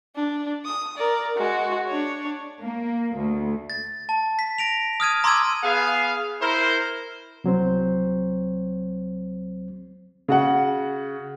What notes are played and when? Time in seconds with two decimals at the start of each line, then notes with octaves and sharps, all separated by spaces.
0.15 D4
0.65 D#6
0.97 A#4 D5
1.37 G#3 F#4
1.87 D4 C#5
2.61 A#3
3.16 D2
3.70 A6
4.09 A5
4.39 B6
4.58 A#6 D7 F7
5.00 D#6 F6 G#6 D#7
5.24 A#5 C6 D6 E6 G#6 D#7
5.63 B3 G#4 F5
6.41 E4 A#4 C5
7.44 C2 F#3 C4 C5
10.28 C#3 F#4 F#5